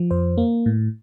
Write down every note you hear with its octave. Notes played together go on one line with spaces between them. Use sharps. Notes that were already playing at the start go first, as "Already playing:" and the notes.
Already playing: F3
F2 C5
A#3
A2